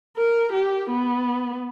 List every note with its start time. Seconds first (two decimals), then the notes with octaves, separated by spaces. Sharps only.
0.17 A#4
0.53 G4
0.90 B3